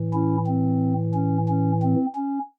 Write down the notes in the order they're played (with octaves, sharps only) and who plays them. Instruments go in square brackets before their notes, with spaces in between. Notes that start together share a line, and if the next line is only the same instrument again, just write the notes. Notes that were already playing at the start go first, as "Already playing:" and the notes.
Already playing: [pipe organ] A2 E3
C#4 E4
C4
C#4
C#4
C4
C#4